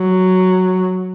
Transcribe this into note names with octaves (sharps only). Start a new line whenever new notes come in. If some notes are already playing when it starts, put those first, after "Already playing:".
Already playing: F#3